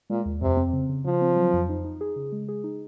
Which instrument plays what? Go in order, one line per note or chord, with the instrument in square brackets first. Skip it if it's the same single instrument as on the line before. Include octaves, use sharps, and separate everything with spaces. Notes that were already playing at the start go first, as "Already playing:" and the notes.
[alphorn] A#2 [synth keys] G#3
[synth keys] D#2
[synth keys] F2 [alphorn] C3
[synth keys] C4
C#3
C#3
[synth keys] C#3 [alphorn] F3
[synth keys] C4
F#3
F2
D#4
D#4
G#4
C#3
G#3
G#4
D#4